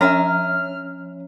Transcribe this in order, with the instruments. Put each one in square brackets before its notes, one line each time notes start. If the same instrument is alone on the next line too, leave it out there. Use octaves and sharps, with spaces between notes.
[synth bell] F3 C#4 C#5 [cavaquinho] E5 G#5 A#5 [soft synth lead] F6